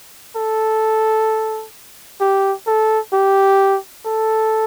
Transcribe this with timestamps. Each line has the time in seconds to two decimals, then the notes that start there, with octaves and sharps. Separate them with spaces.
0.36 A4
2.21 G4
2.67 A4
3.13 G4
4.06 A4